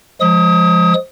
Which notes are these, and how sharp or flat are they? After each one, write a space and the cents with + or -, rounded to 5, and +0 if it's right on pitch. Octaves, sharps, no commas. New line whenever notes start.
F3 +0 G#3 +0 D#6 +25